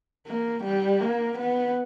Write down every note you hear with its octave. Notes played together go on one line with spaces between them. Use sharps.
A#3
G3
A#3
B3